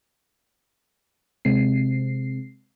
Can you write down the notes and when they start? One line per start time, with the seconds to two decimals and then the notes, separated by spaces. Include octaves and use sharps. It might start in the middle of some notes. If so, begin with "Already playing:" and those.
1.45 C3 G#3 C4 C7